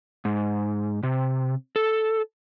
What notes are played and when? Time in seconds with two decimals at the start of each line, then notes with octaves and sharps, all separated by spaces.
0.25 G#2
1.03 C3
1.76 A4